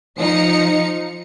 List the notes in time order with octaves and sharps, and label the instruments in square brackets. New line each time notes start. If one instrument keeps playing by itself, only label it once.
[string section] F3 D#4 C#7